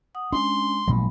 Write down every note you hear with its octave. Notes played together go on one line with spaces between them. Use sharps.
F#5 D#6
G#3 C#4 D4 C6
A1 A#2 F3 F#3 G#3 B5